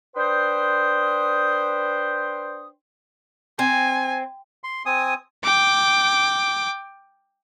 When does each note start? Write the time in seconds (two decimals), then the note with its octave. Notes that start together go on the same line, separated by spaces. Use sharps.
0.16 D4 B4 C5 G5 C6 D#6
3.59 C4 G#5
4.64 C6
4.86 C4 G#5 D#6
5.44 G5 D6